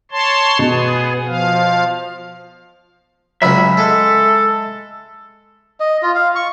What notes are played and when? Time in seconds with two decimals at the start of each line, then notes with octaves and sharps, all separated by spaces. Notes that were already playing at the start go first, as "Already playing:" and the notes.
0.11 C#5 A5 C6
0.59 B2 B3 G#4
1.26 F3 F5
3.42 C#2 F#3 E5 B5 E6
3.77 G#3 A4
5.80 D#5
6.03 F4
6.15 F5
6.36 C#6